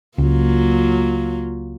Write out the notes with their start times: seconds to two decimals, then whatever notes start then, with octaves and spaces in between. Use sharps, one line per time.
0.18 C#2 F#3 A#3 F4